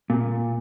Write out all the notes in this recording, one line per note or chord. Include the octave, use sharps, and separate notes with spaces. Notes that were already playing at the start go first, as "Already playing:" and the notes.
A#2